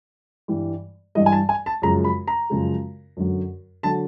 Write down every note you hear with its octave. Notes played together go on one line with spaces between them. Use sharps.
G2 E3 G3
G2 E3 G3 D#5
G#5
A5
G#5
A5
F#2 C#3 F3 G#3 A#5
B5
A#5
F#2 C#3 F3 G#3
F#2 D3 F#3
D3 F#3 A5